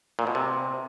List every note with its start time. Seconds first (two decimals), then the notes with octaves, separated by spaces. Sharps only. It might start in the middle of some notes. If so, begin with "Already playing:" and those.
0.19 A#2
0.27 B2
0.35 C3